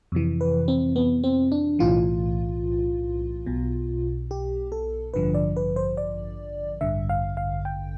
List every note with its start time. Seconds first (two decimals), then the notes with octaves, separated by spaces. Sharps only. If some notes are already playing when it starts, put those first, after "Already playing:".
0.12 F2 C3 E3
0.41 B4
0.68 C4
0.96 B3
1.24 C4
1.52 D4
1.79 B1 A2 E3 F4
3.46 B1 B2
4.31 G4
4.72 A4
5.14 A1 G2 D3 F3 B4
5.34 D5
5.56 B4
5.76 C5
5.97 D5
6.81 A1 G2 D3 E5
7.10 F5
7.37 F5
7.65 G5